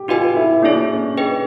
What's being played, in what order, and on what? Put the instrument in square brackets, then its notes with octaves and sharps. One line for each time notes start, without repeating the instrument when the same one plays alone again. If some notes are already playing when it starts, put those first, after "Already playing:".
Already playing: [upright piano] G4
[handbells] D#4 F#4 B4 D#5 G#5 [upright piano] F4
[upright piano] E4
[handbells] A#3 D#4 G#4 C#5 [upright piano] D4
[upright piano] C#4
[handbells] G#4 B4 D#5 G5